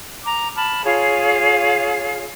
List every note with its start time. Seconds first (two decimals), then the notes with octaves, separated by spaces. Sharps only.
0.25 A#5 D6
0.57 A5 B5 F6
0.84 F4 G#4 C#5 F5